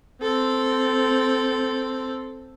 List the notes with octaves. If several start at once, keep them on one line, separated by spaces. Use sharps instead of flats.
C4 A4